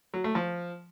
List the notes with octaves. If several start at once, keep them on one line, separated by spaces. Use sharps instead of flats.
F#3
A3
F3